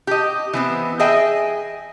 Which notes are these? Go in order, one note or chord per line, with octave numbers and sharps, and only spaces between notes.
G4 D#5
E3 B3 C4
G#4 D#5 E5 G5 G#5